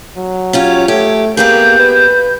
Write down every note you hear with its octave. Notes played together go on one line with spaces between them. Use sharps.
F#3
C#4 F4 G4 C#5
A3 G4
A#3 B3 G4 G#4 G6
B4